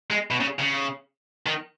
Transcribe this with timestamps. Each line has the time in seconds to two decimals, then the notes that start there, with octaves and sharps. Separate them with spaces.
0.10 G#3
0.31 B2
0.40 C#3
0.59 C#3
1.46 D#3